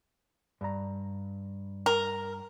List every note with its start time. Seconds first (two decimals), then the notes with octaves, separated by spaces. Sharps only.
0.61 G2 A#5
1.86 A#4